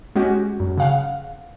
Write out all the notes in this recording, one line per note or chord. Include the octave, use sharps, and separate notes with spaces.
G#3 C#4 F#4 G4
F#2
C#3 F5 F#5